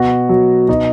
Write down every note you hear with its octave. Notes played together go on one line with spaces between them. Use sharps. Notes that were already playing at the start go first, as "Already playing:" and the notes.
Already playing: B2 F#4
F#3
B2 D#4